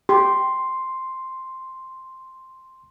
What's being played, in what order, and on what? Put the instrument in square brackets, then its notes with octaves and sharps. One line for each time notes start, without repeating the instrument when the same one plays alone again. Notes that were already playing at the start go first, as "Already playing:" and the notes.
[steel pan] G4 [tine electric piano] C6